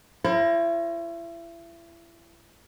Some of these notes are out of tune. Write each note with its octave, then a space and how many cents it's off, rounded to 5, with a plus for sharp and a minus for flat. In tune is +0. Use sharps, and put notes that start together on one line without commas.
E4 +35 A#4 +15 C#5 -45